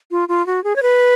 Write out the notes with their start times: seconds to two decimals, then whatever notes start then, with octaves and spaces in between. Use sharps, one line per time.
0.11 F4
0.29 F4
0.47 F#4
0.64 G#4
0.76 C#5
0.82 B4